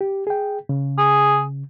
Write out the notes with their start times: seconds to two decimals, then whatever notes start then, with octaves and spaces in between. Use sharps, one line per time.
0.01 G4
0.27 G#4 G5
0.69 C#3
0.98 G#4